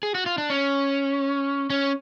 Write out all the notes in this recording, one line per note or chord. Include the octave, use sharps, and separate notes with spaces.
G#4
F#4
F4
D4
C#4
C#4